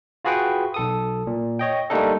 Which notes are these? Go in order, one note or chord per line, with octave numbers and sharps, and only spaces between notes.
F4 F#4 G#4 B4 F#5 G5
B1 A4 D#6
A#2
C#5 D#5 G5
G3 A3 A#3 D4 D#4 A4